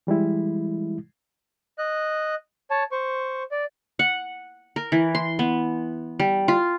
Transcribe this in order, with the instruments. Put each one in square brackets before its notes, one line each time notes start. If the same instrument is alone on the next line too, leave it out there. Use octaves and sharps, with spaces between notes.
[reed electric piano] E3 G3 G#3 E4
[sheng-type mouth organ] D#5 F#6
C#5 A5
C5 C#6
D5
[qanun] F#5
A#4
E3
C6
B3
G3
F4